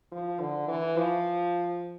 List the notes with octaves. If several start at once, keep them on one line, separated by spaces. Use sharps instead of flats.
F3
D3
E3
F3